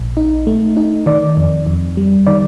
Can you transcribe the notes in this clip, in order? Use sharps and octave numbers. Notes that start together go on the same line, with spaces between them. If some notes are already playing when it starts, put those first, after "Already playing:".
Already playing: A#1
D#4
A3
D#4
D#3 D5
F2
F2
G3
D#3 D5